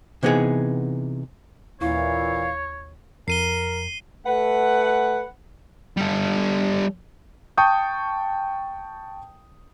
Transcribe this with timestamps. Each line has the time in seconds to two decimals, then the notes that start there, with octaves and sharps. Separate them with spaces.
0.23 C3 E3 B3 D#4 G#4 F#5
1.81 D#2 A#2 E3 E4 C#5 F5 C#6
3.28 F2 A#4 C7 D#7 G7
4.25 A3 B4 F#5
5.97 G3 A4
7.57 G5 A5 C#6 D#6 G6